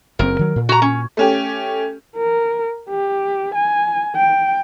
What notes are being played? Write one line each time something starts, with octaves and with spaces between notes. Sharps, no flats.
F#1 F#2 C4 A#4
D#3 F#3
A#2
F#4 A#5
C#4
A3 C#4 G4
A#4
G4
G#5
G5